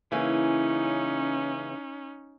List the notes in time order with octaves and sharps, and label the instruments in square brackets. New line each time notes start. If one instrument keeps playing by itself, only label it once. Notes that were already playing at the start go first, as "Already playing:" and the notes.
[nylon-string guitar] C#3 E3 A#3 [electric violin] C#4 D#4